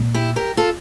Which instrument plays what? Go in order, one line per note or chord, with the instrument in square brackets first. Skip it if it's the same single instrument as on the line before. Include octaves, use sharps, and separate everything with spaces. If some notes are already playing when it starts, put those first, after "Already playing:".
Already playing: [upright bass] A#2
[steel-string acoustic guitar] E4 G4
G4 A#4
F4 A4